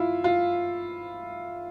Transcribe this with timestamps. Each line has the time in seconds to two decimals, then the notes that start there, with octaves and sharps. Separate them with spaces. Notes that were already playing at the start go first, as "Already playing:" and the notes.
Already playing: E4 F4
0.24 F4